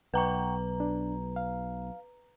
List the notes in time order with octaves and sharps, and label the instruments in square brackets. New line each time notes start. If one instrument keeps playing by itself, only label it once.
[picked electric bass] B1 [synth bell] B4 A#5 [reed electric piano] F#5 G5 C#6
[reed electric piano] D4
F5